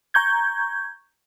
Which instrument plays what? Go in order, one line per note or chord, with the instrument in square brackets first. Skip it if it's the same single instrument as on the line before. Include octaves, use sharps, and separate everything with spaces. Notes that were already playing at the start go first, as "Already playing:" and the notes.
[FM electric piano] A#5 C#6 G6 G#6